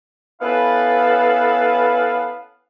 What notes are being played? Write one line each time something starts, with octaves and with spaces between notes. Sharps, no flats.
B3 C#4 E4 A4 B4 F5